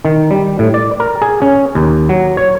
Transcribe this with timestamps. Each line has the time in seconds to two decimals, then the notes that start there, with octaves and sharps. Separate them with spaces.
0.05 D#3
0.31 G3
0.59 A2
0.74 D5
1.00 A#4
1.22 G#4
1.42 C#4
1.75 D#2
2.09 F#3
2.37 C#5